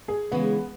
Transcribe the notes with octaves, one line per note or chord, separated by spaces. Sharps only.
G#4
C#3 E3 G#3 B3